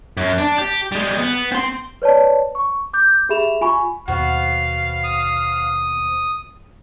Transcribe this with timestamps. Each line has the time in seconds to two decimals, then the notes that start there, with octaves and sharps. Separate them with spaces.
0.17 F#2
0.38 D4
0.58 G4
0.92 G3 G#3
1.18 B3
1.52 C4 C6
2.02 B4 C#5 D5 A5
2.55 C#6
2.93 D6 G6
3.29 G4 G#4 E5 B5 E7 F7
3.61 F4 G#5 B5 C#6
4.08 D#2 B2 B3 F#4 C5 F5
5.04 D#6